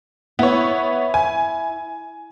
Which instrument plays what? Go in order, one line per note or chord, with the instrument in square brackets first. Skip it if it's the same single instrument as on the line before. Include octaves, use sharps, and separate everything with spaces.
[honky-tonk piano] B3 C#5 [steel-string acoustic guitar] E4
[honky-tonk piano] G#5